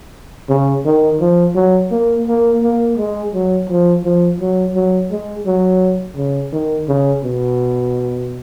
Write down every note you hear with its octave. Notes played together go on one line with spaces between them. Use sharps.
C#3
D#3
F3
F#3
A#3
A#3
A#3
G#3
F#3
F3
F3
F#3
F#3
G#3
F#3
C#3
D#3
C#3
B2